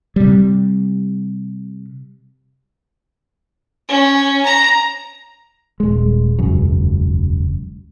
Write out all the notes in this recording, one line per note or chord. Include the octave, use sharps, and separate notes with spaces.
C3 G3
C#4
A#5
D#1 G#3
E1 C#2 F#2